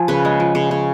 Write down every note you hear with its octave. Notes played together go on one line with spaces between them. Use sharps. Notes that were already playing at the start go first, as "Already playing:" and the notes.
Already playing: F3 G#5
C#3 B4
G#3
F3
C#3
C#3